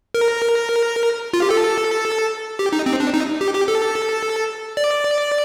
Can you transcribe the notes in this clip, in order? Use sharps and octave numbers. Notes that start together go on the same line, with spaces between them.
A#4
F4
G4
A4
G4
D#4
C4
D4
D#4
G4
G4
A4
D5